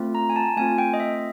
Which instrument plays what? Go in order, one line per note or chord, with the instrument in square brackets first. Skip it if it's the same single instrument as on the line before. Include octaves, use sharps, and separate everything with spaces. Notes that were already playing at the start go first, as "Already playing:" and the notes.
Already playing: [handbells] A3 C4 F4
A#5
G#5
A5
A3 C4 F4 G#5
G5
D#5
E5